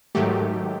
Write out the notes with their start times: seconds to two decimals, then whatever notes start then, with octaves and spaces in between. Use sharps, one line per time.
0.15 G#2 D#3 F#3 A3 G4